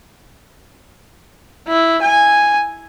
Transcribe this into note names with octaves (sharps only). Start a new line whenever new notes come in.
E4
G#5